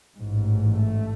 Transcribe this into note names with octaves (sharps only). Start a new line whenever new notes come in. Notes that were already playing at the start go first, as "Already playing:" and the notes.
A1 G#2
A3